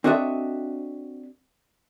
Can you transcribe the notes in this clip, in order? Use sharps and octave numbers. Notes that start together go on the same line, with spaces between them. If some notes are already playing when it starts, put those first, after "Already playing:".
C4 D4 F#4 A4 D#5 E5